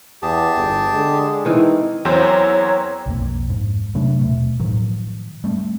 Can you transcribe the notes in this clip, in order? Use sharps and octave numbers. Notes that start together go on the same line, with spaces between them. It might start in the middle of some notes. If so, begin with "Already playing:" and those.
E2 G4 G#4 A5
G1
D3 G#3
D#3 E3 C4 D#4
E2 F#3 C4 A#4 C5 C#5
B1 F2 A#3
F2 G#2
C3 F#3 A3 D4
D#1 B2 A3
A2 D#3 F3 F#3
G3 A3 C4